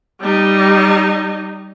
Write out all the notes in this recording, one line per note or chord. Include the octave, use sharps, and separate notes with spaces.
G3 D#4